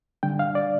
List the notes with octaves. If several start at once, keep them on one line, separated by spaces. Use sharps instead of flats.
D3 G3 D4 G5
F5
D5